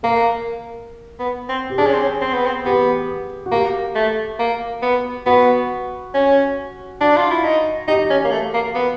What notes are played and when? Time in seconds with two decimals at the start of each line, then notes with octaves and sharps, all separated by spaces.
0.03 A#3 A#4
1.19 B3
1.49 C4
1.70 G4
1.78 D4 G#4
1.86 C#4
1.93 C4
2.02 C#4
2.21 C4
2.33 B3
2.46 C4
2.65 B3 G4
3.46 F#4
3.51 A#3 G4
3.95 A3
4.39 A#3
4.82 B3
5.26 B3 F#4
6.14 C#4
7.00 D4 F#4
7.17 F4
7.31 E4
7.45 D#4
7.88 D#4 G4
8.10 C#4
8.24 A#3
8.31 A3
8.54 A#3
8.75 B3